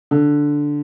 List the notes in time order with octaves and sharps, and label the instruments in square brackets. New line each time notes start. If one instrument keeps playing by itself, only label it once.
[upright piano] D3